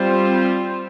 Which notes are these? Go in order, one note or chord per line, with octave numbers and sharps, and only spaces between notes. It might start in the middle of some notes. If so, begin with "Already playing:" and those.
Already playing: G3 C4 F4 C5